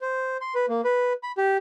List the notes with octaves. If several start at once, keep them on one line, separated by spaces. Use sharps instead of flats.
C5
C6
B4
A#3
B4
B5
G4